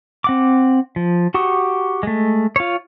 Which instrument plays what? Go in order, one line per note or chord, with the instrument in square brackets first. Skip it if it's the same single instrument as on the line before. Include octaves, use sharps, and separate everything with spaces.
[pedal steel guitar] C4 F#5 D6
F3
F#4 G4 C#6 D#6
G#3 A3
F4 C#5